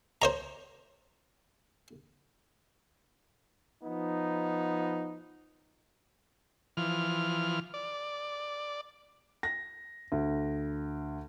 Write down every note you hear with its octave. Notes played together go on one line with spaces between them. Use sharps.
C5 C#5 A#5
F3 B3 D#4
E3 F3 F6
D5
A#6
D2